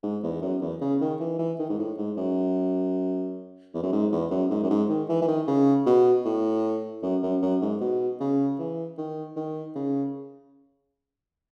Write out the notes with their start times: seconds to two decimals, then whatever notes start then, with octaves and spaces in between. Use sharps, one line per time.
0.03 G#2
0.23 E2
0.42 F#2
0.61 E2
0.81 C#3
1.01 D#3
1.20 E3
1.39 E3
1.59 D#3
1.69 G#2
1.79 A2
1.98 G#2
2.17 F#2
3.74 E2
3.83 F#2
3.92 G#2
4.12 E2
4.31 F#2
4.50 G#2
4.63 F#2
4.70 G#2
4.89 D#3
5.09 E3
5.22 E3
5.28 D#3
5.48 C#3
5.86 B2
6.25 A2
7.03 F#2
7.23 F#2
7.42 F#2
7.62 G#2
7.81 B2
8.20 C#3
8.59 E3
8.98 D#3
9.36 D#3
9.75 C#3